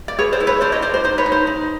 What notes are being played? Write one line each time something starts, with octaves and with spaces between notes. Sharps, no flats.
D5
G#4 B4 C#5
C5 D5
E4
B4 C#5
D4 C5 D5
C#5 D#5
D4 C5 D5
C5
D#4 C5
B4 C#5
D#4
C5
D#4